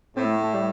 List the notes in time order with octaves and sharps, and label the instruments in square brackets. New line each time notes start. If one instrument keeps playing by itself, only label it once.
[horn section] A2 [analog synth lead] C4
[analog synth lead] A3
A3
G3